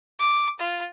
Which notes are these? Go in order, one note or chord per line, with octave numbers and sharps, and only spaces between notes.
D6
F4